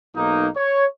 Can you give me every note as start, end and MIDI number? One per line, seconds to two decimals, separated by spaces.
0.16 0.49 35
0.16 0.49 58
0.16 0.49 63
0.57 0.86 73